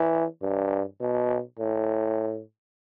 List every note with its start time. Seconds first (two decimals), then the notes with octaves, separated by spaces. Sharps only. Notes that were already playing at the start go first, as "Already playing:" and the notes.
Already playing: E3
0.42 G2
1.00 B2
1.59 A2